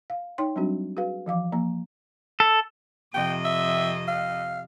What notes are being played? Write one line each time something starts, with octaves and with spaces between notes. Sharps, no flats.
F5
D#4 C#5 G5 C6
F#3 G3 C4 D4 F#4
F#4 G#4 B4 F5
E3 F3 F5 D6
F3 A#3 A#5
A4
F2 C3 D#5 G5
E5
F5